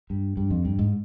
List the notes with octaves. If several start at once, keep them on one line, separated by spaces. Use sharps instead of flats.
G2
G2
F2
G2
G#2